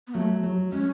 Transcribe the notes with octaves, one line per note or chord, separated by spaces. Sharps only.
B3
F#3 A3
F#3
G#3 C#4